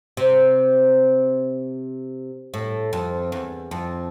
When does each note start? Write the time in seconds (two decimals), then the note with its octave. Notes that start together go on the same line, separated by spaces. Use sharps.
0.17 C3
2.54 A2
2.93 F2
3.32 E2
3.71 F2